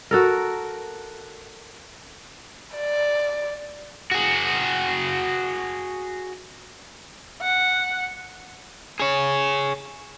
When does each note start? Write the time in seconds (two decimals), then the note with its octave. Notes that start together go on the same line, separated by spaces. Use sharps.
0.11 F#4 A4 A#4
2.76 D5
4.11 F#4 G#4
7.41 F#5
9.00 G#4 C#5